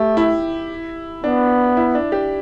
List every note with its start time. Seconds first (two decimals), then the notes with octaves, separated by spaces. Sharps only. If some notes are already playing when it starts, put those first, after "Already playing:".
Already playing: A3 G4
0.17 E4
1.24 B3 D4
1.77 E4
1.95 D4
2.12 G4